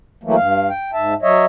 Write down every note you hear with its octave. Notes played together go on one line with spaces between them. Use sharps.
E3 F#3 A3 A#3
G2 F5
G5
G#2 E5 A5
F#3 C#5 D#5 E5